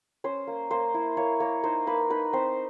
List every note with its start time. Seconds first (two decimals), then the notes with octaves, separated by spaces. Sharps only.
0.24 C#4 C5
0.47 A#3
0.71 A#3 C5
0.94 E4
1.17 A#3 C#5
1.40 A#3 C#5
1.63 D#4 C5
1.87 A#3 B4
2.10 D#4 B4
2.33 C4 C5